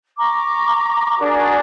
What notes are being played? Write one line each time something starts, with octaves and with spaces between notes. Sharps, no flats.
A#5 C#6 D6
D4 F#4 G#4 A#4